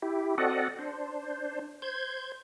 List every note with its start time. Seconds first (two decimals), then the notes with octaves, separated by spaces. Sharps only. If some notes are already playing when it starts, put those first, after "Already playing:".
0.02 E4 G4
0.38 C4 F#4 A4 D5 D#5 F#5
0.79 D4 C5
1.82 C5 G6 G#6